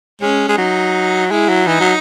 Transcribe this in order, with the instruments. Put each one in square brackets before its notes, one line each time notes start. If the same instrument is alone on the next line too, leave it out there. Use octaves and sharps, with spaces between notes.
[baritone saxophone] G#3 [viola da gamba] C#4
[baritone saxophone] G#3
[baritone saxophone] F#3 [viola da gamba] D#4
[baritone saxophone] G#3 [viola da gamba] E4
[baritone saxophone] F#3
[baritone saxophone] E3 [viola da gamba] D#4
[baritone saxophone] F#3